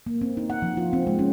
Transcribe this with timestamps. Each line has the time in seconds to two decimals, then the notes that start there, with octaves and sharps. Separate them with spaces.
0.06 A#3
0.21 C4
0.37 D#4
0.50 F#5
0.62 F3
0.77 F4
0.93 C4
1.07 G#3
1.19 C#4